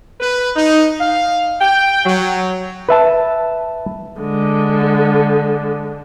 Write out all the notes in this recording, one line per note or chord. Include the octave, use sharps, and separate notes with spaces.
B4
D#4
F5
G5
F#3
B4 E5 A5
D3 G#3